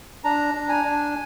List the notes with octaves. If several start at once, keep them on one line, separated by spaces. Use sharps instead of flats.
D4 A#5
D4
G#5
D4